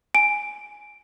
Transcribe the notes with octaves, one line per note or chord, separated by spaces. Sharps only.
G#5 D7